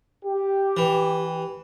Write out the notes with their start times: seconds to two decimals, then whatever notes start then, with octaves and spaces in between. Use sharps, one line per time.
0.24 G4
0.77 E3